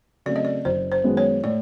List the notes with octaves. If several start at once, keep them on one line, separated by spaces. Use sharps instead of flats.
C#3 F#3 A3 C4 D5
D#5
D5
F#1 C5
C5
F#2 D#3 G#3 B3
C#5
A2 D5